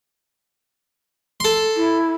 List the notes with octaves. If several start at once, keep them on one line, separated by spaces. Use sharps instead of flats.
A4 C6
E4